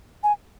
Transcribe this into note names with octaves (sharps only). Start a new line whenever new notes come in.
G#5